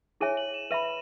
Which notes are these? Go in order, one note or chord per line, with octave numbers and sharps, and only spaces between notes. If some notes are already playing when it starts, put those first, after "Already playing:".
E4 G#4 C#5 E5 G#5 D#7
F#7
E7
B4 E5 B5 D#7